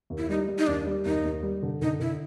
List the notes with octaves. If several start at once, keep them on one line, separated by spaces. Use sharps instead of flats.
D#2
E4
G3 D#4
G3
D#4
D#2 D4
G3
D#2 D#4
D#2
G3
D3
D3 D#4
D3 E4